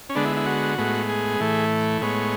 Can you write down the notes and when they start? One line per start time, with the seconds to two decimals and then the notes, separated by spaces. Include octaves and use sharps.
0.10 C#4
0.15 D3 G#3 B3 D4
0.25 E4
0.37 E4
0.46 F#4
0.78 A2 G#3 B3
1.09 G#4
1.40 A2 E3 A3
2.01 A2 G#3 B3 C#5